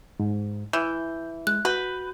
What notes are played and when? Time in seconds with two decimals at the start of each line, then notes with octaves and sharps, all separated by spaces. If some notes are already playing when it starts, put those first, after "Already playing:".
0.20 G#2
0.73 E3 G6
1.47 G#3 F#6
1.65 F#4 B4 G6